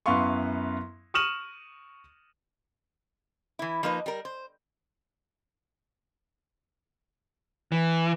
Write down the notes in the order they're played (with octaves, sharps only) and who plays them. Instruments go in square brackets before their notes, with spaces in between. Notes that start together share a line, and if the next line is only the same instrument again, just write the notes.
[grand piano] F#2 B3 E4 F5 C6 C#6
C#6 D#6 F6 D#7 E7 F#7
[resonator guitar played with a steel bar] E3 E4
F3 A#3 D#4 B4
G3 A#4
C5
[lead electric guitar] E3